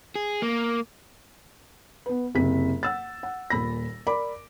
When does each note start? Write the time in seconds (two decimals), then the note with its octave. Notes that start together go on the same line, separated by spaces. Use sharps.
0.15 G#4
0.42 A#3
2.06 B3 B4
2.35 F#1 C3 C4 B6
2.83 F#5 E6 A6
3.23 F#5
3.50 D#1 A#2 B5 A#6
4.07 A#4 D5 B5 D6